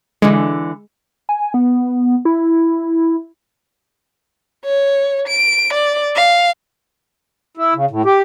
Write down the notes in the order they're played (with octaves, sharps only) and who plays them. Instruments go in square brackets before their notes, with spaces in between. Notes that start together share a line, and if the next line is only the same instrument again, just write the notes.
[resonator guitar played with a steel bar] D3 E3 [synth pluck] G#3
[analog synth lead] G#5
B3
E4
[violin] C#5
D7
D5
F5
[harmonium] E4
C#3
A2
G4